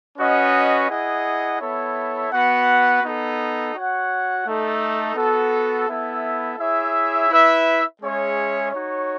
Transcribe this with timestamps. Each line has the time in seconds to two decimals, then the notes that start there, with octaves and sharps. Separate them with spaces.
0.18 C#4 F#4 B4 D#5 F#5
0.89 E4 G#4 D#5 F#5
1.61 B3 E4 A4 C#5 E5
2.32 B3 F#4 B4 F#5
3.03 B3 D#4 A4
3.75 F#4 C#5 F#5
4.45 A3 D#4 A4
5.16 B3 F#4 A4
5.88 B3 E4 A4 E5
6.58 E4 G#4 C#5 E5
7.30 E4 B4 E5
8.01 G#3 C#4 G#4 C#5 E5
8.72 D#4 F#4 C#5